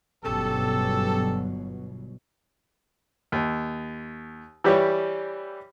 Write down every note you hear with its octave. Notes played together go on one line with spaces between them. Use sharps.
G1 B2 F#3 C#4 G4 A4
D#2
E3 G3 G4 C#5